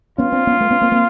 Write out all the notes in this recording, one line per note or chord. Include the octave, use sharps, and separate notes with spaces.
B3 C#4 F4
C4 D4
B3 C#4
A3 B3
B3 C#4
A#3 C4
A#3 C4